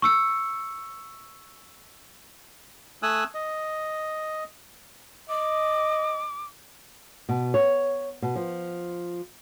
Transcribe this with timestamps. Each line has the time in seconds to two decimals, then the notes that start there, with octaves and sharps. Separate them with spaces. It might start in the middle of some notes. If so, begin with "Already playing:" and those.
0.02 C#6 E6 C#7
3.03 A3 G#5 D#6 E6 F#6
3.34 D#5
5.29 D#5 D6
7.29 B2
7.54 C#5
8.22 B2
8.35 F3